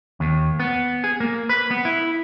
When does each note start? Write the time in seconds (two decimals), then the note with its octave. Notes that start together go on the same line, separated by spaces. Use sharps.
0.20 D#2
0.60 B3
1.04 G#4
1.20 A#3
1.49 B4
1.71 B3
1.85 E4